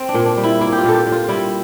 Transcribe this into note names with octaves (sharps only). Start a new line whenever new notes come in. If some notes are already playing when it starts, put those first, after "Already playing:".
Already playing: C4
D4
A#2
D4
G3
E4
A#3 E4
G4
F4
A#2 A4
G4
A#2
F4
G3 E4